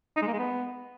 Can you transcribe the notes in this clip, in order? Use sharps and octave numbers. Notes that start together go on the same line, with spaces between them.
D#4
G#3
A#3
G#3
B3